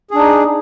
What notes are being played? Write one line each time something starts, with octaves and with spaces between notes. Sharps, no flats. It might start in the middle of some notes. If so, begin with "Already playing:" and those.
D4 D#4 G#4